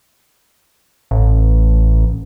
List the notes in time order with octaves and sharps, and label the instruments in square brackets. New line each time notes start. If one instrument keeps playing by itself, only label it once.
[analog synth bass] A1